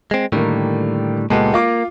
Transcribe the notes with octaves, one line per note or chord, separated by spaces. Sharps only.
G#3 C4
A2 D3 D#3 G3 A#3
C#2 A#2 G#3 B3 G4 A4
A#3 F4 F5 D6